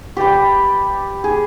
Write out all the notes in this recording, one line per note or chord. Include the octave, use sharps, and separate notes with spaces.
G4 D5 G5 B5
G#4